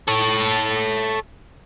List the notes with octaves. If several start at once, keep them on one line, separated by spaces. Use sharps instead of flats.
A4 C#5